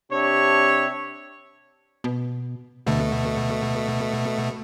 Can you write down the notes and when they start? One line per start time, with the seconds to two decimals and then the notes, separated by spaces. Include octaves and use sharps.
0.11 C3 D4 G4 C#5 E5
2.04 B2
2.87 D2 B2 A3